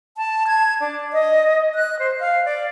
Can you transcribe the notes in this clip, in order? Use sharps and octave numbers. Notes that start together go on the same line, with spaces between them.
A5
G#6
D4
D#5
F#6
C5
F5
D5